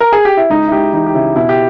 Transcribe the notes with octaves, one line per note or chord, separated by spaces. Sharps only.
A#4
G#4
G4
E4
C#2 D#4
E4
C#2 G4
E3 D#4
G4
C#3 E4
B2 E4
G4